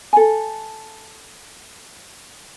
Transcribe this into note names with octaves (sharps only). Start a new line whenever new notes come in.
A4 G#5